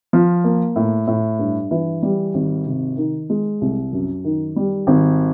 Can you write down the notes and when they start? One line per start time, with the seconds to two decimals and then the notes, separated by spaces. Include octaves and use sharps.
0.13 F3
0.44 A#3
0.76 A2
1.07 A2
1.39 G2
1.71 E3
2.03 G3
2.34 G#1
2.66 C3
2.97 D#3
3.30 G#3
3.61 C2
3.93 F#2
4.24 D#3
4.56 G3
4.87 G#1